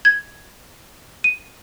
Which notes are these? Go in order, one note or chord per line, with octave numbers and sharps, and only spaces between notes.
G#6
D#7